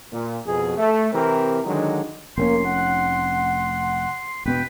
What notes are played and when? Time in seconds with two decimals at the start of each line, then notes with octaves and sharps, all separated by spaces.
0.12 A#2
0.47 F2 B2 G#4
0.77 A3
1.13 C3 E3 C4 G4 A#4
1.65 D3 D#3 F#3 G#3 D4 D#4
2.38 F1 A#3 C4 C#4 C6
2.65 F#5
4.46 E1 B2 B3 B4 G5